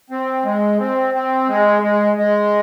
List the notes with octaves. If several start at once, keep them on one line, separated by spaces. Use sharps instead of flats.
C4
G#3
C4
C4
G#3
G#3
G#3